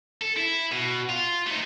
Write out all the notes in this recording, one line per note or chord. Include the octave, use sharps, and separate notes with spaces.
A4
E4
B2
F4
A3 D#4